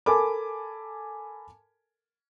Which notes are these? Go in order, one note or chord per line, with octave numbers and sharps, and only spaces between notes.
A4 A#4 G#5 A5 B5 D6